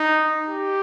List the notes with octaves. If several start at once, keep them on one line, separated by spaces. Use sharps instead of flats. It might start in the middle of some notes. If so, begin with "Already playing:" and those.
Already playing: D#4
G4